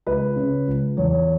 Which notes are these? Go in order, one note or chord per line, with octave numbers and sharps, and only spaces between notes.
C#2 B4
C#3
C#2
E2 C#5